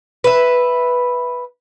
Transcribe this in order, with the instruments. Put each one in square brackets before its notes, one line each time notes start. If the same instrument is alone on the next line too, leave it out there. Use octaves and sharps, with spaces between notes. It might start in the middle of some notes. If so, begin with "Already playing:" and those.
[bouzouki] B4 E5